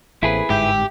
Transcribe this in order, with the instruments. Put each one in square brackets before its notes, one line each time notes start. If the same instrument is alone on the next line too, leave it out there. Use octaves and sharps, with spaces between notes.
[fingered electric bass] A1 [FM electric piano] A3 A#3 C4 [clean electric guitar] E4 G#4 B4
[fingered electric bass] G1 G#2 [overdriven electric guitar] G4 [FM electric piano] E5 G5